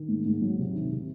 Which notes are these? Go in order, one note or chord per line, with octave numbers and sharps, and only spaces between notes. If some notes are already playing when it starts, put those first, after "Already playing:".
Already playing: D#3
G#2
G#2
F#3
C3
D#3
C3